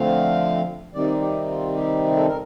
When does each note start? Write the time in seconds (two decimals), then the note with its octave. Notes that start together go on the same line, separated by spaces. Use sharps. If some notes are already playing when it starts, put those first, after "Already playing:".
Already playing: D3 F3 A3 C4 F5
0.94 C3 D#3 G3 C4 D#4 D5
1.21 G4
1.49 F4
1.76 G4
2.17 A4
2.28 A#4